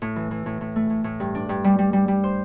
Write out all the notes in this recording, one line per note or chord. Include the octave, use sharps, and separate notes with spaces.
A2
E3
E3
A2
A2
A3
A2
A2
G2
D4
G2
G3
G3
G3
G3
C5